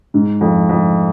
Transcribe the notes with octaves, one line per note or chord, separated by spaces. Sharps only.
G#2
F2
F2